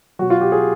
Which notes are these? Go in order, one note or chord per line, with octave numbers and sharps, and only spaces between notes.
B2 F#3 F#4
F4
G4
G#4